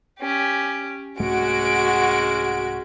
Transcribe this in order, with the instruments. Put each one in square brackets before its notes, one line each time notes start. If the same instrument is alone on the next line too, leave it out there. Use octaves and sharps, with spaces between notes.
[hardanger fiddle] C#4 G4
[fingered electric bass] C2 G#2 A3 [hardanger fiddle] G#3 C#4 [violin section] F#4 D7